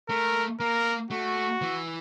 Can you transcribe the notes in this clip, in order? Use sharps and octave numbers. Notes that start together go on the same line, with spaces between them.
A3 A#4
A#3 A#4
A3 F#4
E3